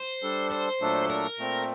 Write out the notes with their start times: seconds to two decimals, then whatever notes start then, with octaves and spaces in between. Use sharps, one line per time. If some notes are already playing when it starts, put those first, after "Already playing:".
Already playing: C5
0.23 G3 D4 A4
0.52 C5
0.81 A#2 F#3 A3 D4 A4
1.10 A#4
1.38 A#2 A3 C4